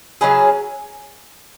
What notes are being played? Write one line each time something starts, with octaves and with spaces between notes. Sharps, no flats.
F#3 C#4 G#4 B4